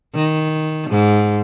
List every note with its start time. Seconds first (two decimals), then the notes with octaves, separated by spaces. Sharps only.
0.14 D#3
0.90 G#2